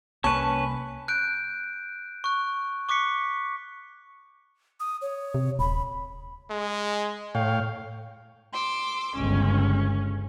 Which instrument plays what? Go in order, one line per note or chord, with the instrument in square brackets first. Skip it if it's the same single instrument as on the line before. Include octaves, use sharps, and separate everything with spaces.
[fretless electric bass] C2 A#3 [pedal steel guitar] C#4 B4 [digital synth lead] A5 [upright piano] C#6
[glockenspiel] F#6 G6 D7
C#6 F#6
C#6 D6 F#6 B6 C#7
[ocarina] D#6
C#5
[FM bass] C3
[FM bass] D#1 [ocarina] B5
[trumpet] G#3
[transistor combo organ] A2 C#5 G5 [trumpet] F5
[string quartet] C6 D6 E6
[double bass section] G1 C#2 [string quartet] C#4